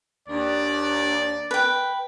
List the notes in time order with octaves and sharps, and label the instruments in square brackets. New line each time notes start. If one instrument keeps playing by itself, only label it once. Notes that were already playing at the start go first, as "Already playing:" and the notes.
[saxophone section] D#2 D4 [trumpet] D5
[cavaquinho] B4 G5